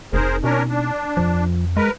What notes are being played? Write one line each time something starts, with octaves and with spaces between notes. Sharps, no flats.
F1 C4 D#4 G#4 A#4 C5
B2 C#4 D4 A#4
D4
F2 F3
G#3 A#4 B4